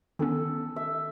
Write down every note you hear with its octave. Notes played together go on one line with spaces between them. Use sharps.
D#3 B3 C#4 A4
E5